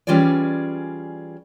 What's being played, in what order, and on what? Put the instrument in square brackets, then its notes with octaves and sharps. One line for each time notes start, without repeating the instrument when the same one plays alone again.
[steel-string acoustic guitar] E3 G3 C#4 F4 G#4 D5